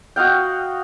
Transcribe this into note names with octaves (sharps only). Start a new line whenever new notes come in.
F#4 D#5 F5 G5